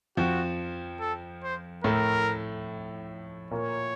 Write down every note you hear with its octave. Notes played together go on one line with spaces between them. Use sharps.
F2 F3 F#4
A4
C5
A2 A3 A#4
A#2 A#3 C#5